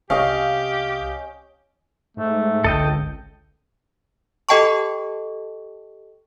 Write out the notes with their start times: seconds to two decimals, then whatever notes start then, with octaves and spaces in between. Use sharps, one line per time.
0.10 C2 C#4 G4 D#5 F5 G5
2.17 G#2 A3
2.64 G#1 C#2 D3 A4 D#5 G5
4.49 G4 A4 D#5 G5 A5 C#6